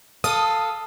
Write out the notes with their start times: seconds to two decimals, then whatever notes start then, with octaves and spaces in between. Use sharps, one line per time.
0.24 A4 F5 D#6